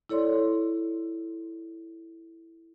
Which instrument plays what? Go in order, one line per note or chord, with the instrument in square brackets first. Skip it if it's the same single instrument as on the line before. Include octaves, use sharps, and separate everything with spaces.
[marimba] E4 A4 C#5 D5 C6